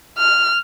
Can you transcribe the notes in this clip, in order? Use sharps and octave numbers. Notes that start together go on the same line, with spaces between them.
F6